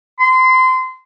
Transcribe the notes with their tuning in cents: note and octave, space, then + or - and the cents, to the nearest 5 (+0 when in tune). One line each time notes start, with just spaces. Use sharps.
C6 -25